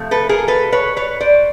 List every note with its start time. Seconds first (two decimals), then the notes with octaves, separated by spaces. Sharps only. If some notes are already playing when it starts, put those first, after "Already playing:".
Already playing: C3 F3 A3
0.11 A4 B4
0.29 G#4 A#4
0.48 A4 B4
0.72 B4 C#5
0.96 B4 C#5
1.21 C5 D5